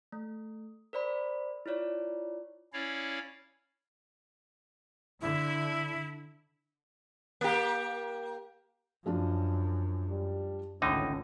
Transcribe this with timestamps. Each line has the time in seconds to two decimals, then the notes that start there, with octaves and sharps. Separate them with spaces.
0.12 A3
0.93 A#4 C5 D5 B5
1.66 E4 F4 C#5 D5
2.73 C#4 E4 C#5 D5 F5
5.21 D3 E4
7.41 A#3 G4
9.06 F#2 F3 D4 F4
10.09 G3
10.82 G#1 C#2 A2 D3 C#4 D#4